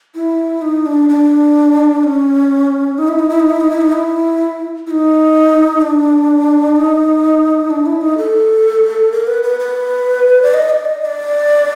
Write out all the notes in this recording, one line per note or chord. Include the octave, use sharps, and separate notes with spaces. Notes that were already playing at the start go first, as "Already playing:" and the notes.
E4
D#4
D4
D4
C#4
D#4
E4
D#4
E4
D#4
E4
D#4
E4
D#4
E4
E4
D#4
D4
D#4
D4
E4
D#4
A4
A#4
B4
B4
B4
D5
D#5
D5
D#5
D#5
D5